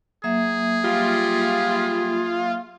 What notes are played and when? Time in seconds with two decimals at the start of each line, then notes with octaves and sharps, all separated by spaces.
0.24 F#3 A#3 G#4 E5
0.84 G3 F4